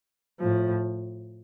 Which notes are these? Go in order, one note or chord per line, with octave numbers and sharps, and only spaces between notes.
A2 F3